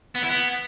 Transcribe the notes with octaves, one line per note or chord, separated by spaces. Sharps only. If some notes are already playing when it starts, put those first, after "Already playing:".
B3
E4
B3